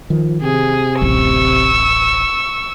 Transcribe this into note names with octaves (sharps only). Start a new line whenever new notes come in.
D#3 F3
C3 G#4
D1 A1 C#6 E6